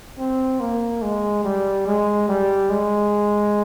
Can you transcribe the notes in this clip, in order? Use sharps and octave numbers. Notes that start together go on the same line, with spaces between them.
C4
A#3
G#3
G3
G#3
G3
G#3